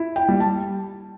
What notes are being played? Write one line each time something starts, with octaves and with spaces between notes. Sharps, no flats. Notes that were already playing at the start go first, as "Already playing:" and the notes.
Already playing: E4
G5
G3
A5